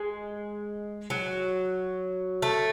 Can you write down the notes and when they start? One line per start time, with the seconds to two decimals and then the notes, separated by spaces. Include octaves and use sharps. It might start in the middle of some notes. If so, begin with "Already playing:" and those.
Already playing: G#3
1.10 F#3
2.42 A3